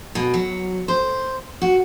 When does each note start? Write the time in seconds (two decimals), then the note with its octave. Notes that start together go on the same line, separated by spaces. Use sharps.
0.15 B2
0.34 F#3
0.88 C5
1.62 F#4